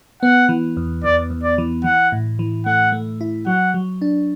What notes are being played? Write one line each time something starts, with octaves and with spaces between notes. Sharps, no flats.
B3 F#5
E3
E2
E2 D5
E2
D5
E3
E3 F#5
A2
E3
A3 F#5
A3
E4
F#3 F#5
F#3
D4